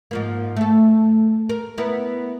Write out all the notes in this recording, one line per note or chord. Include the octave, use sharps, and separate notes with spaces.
G#2 F3 A#3
A3 A4
A#4
B3 E4 A#4